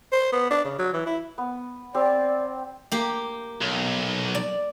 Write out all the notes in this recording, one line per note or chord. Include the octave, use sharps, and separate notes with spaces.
C5
B3
D4
C#3
F#3
E3
E4
B3
C4 G4 D5
A#3 G4
B1
D5